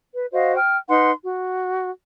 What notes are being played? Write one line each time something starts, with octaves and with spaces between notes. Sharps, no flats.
B4
F#4 C5 D#5 F5
G5 F6
D#4 B4 F#5 C6
F#4